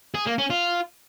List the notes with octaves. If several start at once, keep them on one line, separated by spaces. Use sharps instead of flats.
G#4
A#3
C#4
F4